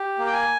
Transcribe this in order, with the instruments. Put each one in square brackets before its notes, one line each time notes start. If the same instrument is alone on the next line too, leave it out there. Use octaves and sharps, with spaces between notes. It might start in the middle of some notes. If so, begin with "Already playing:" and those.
Already playing: [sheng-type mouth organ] G4
A#3
G5
G#5